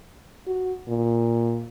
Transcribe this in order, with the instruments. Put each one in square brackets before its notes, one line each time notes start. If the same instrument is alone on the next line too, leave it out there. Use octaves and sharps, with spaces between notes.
[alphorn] F#4
A#2